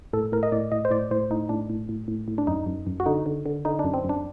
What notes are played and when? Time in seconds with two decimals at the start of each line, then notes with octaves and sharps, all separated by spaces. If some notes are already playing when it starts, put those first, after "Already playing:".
0.13 A2 A4
0.32 A2 A#4
0.43 D#5
0.52 A2 D5
0.72 A2 D#5
0.85 C5
0.91 A2 D5
1.11 A2 C5
1.31 A2 D#4
1.49 A2 D4
1.70 A2
1.89 A2
2.08 A2
2.28 A2
2.38 D4
2.47 F#2 D#4
2.67 F#2
2.87 F#2
3.00 F#4
3.06 D3 D#4
3.26 D3
3.46 D3
3.65 D3 D#4
3.79 D4
3.84 F#2
3.94 C4
4.04 F#2
4.09 D4